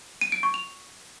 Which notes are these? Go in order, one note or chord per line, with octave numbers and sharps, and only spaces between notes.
D#7
D7
C#6
F7